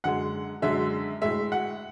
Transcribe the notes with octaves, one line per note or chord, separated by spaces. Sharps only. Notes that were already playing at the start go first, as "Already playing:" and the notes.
F#2 D3 G#3 F#5
F#2 D3 G#3 E5
A2 G#3 E5
F#5